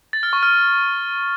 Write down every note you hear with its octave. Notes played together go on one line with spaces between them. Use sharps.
A6
F6
C#6
F6